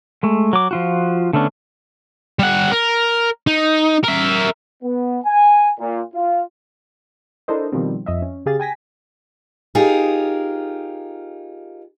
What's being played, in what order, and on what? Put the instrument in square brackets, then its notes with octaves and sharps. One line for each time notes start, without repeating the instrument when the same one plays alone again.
[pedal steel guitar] G#3 A3
F#3 D6
F3 F4 F#4
D3 A3 B3 C#4 D4
[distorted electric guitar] G3 F#5
A#4
D#4
A#4 E5
[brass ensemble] B3
G#5
A#2
F4
[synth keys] D4 E4 A4 A#4 C5 D#5
B2 D#3 F3 G3 C4
F2 D#5 E5
C#4
C#3 G4 G#4 F5 A6
G5 G#5 A#6 B6
[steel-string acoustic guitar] D#4 F4 G4 G#4 A#4